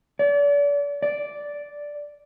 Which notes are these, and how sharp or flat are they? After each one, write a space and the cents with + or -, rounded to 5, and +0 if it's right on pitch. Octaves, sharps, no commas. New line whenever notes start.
D5 -35
D5 -5